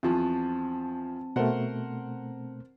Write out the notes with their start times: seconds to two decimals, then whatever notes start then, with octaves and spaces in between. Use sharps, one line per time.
0.03 E2 F3 C4 A5
1.36 B2 A3 A#4 C5 F#5